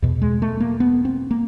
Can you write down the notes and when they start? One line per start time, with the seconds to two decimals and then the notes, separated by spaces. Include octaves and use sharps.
0.02 E2 B2
0.22 G#3
0.42 A3
0.60 A#3
0.80 B3
1.05 C4
1.31 A#3